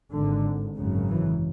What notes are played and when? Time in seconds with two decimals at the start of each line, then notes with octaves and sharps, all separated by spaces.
0.11 G#1 G#2 D3
0.76 G#1 F#2 C#3
1.09 E3